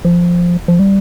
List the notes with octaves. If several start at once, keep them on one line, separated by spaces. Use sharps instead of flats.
F3
F3
G3